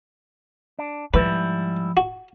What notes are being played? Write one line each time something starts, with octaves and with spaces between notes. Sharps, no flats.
D4
G#2 F3 G3 E4 B4
F#4